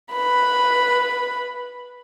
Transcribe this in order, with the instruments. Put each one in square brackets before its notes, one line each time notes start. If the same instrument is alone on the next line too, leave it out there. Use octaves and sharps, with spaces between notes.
[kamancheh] B4 B5